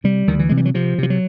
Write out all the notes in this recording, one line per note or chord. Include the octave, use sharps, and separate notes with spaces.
C3 G3
D2 D#3
E3
C3 G#3
G3
F#3
C3 F3
C3 F3
F#3